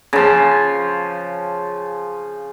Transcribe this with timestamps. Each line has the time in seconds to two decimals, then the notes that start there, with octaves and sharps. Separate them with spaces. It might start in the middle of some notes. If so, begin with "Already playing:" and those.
0.13 C#3 F3